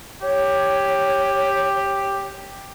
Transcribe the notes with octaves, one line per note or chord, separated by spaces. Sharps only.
G4 C#5